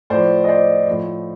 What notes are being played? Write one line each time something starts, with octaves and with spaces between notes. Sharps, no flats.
A2 F3 C5 D5
D#5
C5 D5
A2 F3